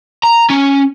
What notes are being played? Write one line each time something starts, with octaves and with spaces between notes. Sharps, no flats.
A#5
C#4